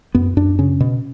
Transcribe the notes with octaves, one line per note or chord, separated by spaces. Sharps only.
F#2 B3
F#2 D4
C#3 C#4
B2